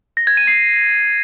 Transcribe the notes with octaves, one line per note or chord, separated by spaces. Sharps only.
A#6
G#6
D#7
C7